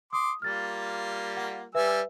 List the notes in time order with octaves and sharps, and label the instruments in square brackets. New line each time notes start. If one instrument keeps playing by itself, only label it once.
[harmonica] C6 D6 [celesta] D#6
[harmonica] G3 A#3 F4 [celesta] F6 A6
[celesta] F#5
[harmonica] G3 G#5 E6 [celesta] B4 E5